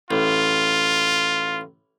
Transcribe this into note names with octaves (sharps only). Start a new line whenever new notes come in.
A1 F4